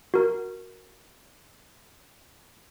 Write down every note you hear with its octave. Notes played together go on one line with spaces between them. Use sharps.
F#4 A#4